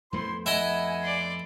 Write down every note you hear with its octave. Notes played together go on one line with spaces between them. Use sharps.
F2 A3 B3 E4 C5 C6
E4 D#5 F#5 G#5
D5 C6